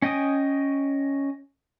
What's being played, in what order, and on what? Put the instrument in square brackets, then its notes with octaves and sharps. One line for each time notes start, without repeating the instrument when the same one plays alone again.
[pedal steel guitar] C#4 D#5 G5 G#5 D#6